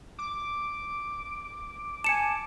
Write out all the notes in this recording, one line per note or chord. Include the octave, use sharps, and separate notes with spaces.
D6
G#5 A5 C#7 E7